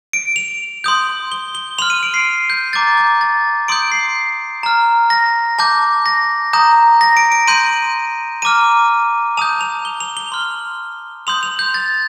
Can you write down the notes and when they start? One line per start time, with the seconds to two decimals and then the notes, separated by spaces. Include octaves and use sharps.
0.13 D7
0.36 F7
0.84 C6 D#6 G6
1.32 G7
1.55 G7
1.78 C6 F6 F7
1.90 D#7
2.03 D7
2.14 C7
2.50 G6
2.73 A#5 D6 G6 A6
2.97 G6
3.21 A6
3.68 C6 D#6 G6 D7
3.92 C7
4.63 A#5 F6
5.10 A#6
5.59 A5 D6 G6
6.06 A#6
6.53 A#5 D#6 G6
7.01 A#6
7.17 D7
7.32 D7
7.47 C6 G6 D#7
8.42 A#5 D6 F6 D#7
9.37 A5 D#6 G6 F7
9.61 F7
9.85 G7
10.00 F7
10.17 G7
10.32 C6 F6
11.27 C6 D#6 G6 F7
11.43 F7
11.59 G6
11.74 A6